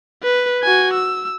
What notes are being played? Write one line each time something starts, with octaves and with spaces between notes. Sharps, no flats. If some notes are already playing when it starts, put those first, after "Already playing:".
B4
F#4 G#5
E6